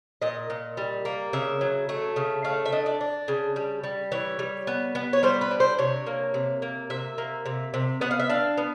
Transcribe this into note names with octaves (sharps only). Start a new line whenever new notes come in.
A#2 D#5
A#2
G3
A#3
C#3 E5
F#3
A3
C#3
A3 F5
E5
D4 D#5
D5
D4
C#3
G3
G3
E3 C#5
G3
B3
B3
C#5
G3 C5
B4
D4
C5
C3 C#5
A#3
C3
A#3
C3 E5
A#3
C3
C3
B3 F#5
F5
E5
D4 F5
B3